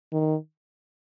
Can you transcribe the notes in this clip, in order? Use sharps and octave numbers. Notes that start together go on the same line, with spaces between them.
D#3